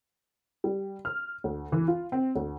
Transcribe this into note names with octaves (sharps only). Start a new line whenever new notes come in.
G3
F6
D2
E3
F4
C4
D2